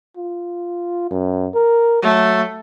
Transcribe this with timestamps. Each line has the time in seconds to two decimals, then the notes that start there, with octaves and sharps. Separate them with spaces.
0.17 F4
1.11 F#2
1.54 A#4
2.03 F#3 A3